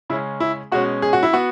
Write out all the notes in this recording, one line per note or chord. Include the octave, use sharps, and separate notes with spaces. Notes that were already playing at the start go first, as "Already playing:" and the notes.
C#3 G#3 C#4 E4
E4
B2 G#3 C#4 F#4
G#4
F#4
E4
B3 F#4